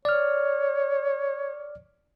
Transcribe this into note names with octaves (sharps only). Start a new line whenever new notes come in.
C#5 D5 F6